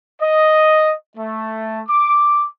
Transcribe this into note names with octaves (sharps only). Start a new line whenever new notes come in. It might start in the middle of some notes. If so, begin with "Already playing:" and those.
D#5
A3
D6